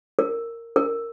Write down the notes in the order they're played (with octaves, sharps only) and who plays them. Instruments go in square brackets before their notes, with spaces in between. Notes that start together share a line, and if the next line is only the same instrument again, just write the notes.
[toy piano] A#4
A#4